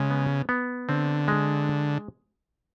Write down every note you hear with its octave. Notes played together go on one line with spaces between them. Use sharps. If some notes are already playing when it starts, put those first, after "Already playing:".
Already playing: C#3 G#3
B3
B3
D3 C4
G#3